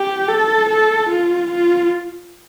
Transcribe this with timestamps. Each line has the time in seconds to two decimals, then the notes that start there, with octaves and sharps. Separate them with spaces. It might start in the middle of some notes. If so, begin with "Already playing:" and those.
Already playing: G4
0.28 A4
0.70 A4
1.10 F4
1.51 F4